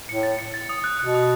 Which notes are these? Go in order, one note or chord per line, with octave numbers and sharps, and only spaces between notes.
A2 C#7
A6
C#7
A6
D#6
F#6
B2 F#6
D#6